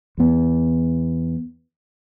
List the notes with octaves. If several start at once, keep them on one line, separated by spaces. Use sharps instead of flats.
E2 B3